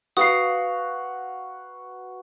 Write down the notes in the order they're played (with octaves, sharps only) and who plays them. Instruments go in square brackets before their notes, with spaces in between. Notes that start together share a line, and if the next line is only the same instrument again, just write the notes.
[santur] F#4 B4 F5 [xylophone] D#6 C7